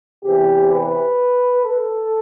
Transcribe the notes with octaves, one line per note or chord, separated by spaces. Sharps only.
E2 C3 E3 G4
B4
A4